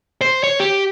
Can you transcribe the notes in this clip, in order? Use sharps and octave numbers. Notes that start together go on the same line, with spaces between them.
C5
C#5
G4